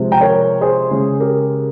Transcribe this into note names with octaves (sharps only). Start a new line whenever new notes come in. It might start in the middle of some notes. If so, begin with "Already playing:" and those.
Already playing: C3 F3 G#3 C4
G5 A#5
A#4 C#5
G#4 C5
C#3 G#3 C#4
G4 A#4